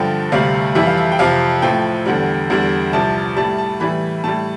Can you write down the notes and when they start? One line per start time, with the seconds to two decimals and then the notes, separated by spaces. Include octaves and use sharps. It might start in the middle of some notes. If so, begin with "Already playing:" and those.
Already playing: G2 D3 F3 G5
0.32 D2 C3 G3 F5
0.75 F2 E3 G3 E5
0.86 F5
0.97 E5
1.12 G5
1.19 F2 C3 F3 F5
1.62 A2 F3 G5
2.06 E2 D3 G3
2.50 E2 D3 G3
2.93 C2 C3 F3 A5
3.36 A2 G3 A5
3.58 A5
3.80 A2 E3 G3 B5
4.24 A2 G3 A5